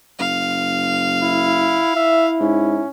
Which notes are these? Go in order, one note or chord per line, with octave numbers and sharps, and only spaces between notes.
F#1 F5
E4
E4 E5
G#2 C#4